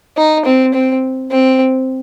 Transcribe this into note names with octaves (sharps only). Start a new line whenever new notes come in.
D#4
C4
C4
C4